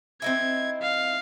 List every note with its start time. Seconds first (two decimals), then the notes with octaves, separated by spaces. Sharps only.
0.22 C4 D#4 E4 G#6
0.82 F5